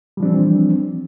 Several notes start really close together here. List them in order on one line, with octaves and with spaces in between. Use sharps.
G3 F3 D4 C4 E3